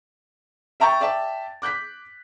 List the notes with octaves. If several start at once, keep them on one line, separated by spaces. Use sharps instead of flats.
E5 G5 A#5 C#6 G6 A6
D5 E5 G5 A5
D6 F#6 G6 B6